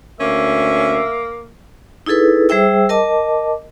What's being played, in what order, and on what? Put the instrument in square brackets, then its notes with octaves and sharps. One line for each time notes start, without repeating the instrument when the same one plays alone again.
[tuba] D2 [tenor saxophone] A#3 [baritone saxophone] C#4 [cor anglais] E5
[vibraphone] D#4 E4 G#4 A4 B4
G3 G#4 C5 E5 G5 E6
A#4 D#5 A5 D6